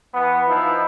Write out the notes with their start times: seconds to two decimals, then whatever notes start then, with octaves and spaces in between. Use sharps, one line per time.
0.13 E3 B3
0.48 F3 D#4 E4